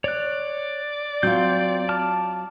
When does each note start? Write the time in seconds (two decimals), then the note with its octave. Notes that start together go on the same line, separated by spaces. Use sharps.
0.04 C#5 D5 F#6
1.23 F#3 C4 F4 G6
1.89 A5 D6 F6